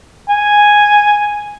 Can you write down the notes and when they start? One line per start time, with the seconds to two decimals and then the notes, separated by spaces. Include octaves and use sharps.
0.29 G#5